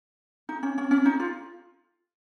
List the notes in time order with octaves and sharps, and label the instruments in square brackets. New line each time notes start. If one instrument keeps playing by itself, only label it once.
[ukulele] D#4
C#4
C#4
C#4
D#4
F4